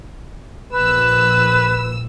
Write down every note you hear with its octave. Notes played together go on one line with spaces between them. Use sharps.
A#1 B4 E6